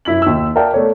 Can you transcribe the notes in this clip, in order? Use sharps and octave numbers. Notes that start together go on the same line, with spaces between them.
F#2 E4 B6 F#7
D#2 E6
A#4 D5 E5 F5 G5 A5
A3 B3 A4 C#5 D5